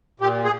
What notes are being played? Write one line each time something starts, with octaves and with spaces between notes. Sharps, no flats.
A#2 G4
G#4